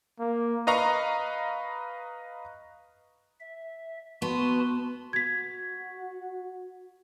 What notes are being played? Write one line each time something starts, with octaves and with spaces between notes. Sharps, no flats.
A#3
B4 D#5 F5 A#5 C#6
E5
B3 F#4 A5 C6
F#4 G#6 B6